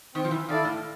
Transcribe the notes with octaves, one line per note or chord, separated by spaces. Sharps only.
D#3 C4
F3
E3
D#3 E4 A4 D5 F5
A2